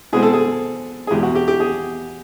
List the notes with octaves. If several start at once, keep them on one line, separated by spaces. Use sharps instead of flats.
B2 G#3 C4 G#4
A4
G#4
G#4
E2 B2 G#3 G4
F#4
G4
G4
G#4